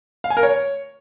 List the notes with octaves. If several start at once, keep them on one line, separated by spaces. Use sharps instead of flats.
F5
G#5
A#4
C#5